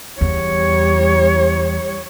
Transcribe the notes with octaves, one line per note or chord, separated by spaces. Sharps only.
E2 G3 C#5